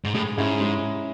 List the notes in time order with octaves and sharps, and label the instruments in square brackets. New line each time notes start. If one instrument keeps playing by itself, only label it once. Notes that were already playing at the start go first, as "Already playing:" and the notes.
[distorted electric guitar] G#2
[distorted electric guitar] A2 [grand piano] G#3
[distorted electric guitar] G#2 [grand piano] C#4 E4 G#4
[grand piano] G#3